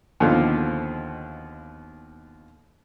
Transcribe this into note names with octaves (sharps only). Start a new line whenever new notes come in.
D#2 B2 D3 F3 C5 F5